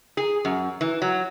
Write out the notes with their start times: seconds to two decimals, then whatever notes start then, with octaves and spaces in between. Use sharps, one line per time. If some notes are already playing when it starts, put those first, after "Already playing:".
0.17 G#4
0.45 F#2
0.81 E3
1.02 F#3